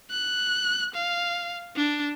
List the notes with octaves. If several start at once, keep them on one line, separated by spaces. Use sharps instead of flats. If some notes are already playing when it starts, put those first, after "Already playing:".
F#6
F5
D4